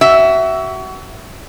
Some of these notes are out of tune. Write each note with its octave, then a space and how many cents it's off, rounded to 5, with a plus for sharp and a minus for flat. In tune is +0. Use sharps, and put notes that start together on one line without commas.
F#4 +30 E5 +0